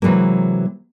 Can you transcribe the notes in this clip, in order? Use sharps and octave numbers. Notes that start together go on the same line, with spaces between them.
C3 E3 F#3 G#3 A#3